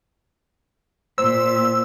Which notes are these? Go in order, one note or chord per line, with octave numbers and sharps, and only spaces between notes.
A#2 C5 E6